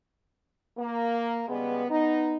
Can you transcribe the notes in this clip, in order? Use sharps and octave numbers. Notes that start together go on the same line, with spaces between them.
A#3
C#3 G3 G#3 B3
B3 D#4